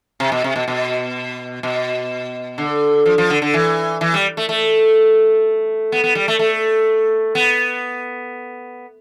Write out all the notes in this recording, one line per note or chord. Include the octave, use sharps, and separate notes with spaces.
C3
B2
C3
B2
B2
B2
D3
F3
F3
D3
D3
E3
E3
G3
A3
A3
B3
B3
G3
A3
A3
B3